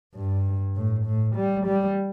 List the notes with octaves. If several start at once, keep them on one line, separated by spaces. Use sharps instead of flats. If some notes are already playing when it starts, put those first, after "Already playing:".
G2
A2
A2
G3
G3